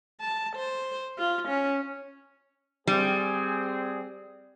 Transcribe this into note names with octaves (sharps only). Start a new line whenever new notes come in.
A5
C5
F4
C#4
G3 C4 G#4